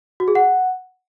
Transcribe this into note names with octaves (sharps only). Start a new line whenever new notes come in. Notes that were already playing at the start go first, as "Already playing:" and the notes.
F#4
G#4
F#5